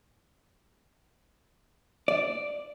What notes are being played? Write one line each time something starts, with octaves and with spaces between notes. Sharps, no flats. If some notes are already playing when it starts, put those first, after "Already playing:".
D5